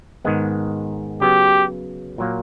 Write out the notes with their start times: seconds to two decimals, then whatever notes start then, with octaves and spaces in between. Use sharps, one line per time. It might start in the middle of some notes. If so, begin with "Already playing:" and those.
0.25 G#2 D#3 G#3 B3
1.21 C#3 F#3 B3 G4
2.18 A#2 F#3 A#3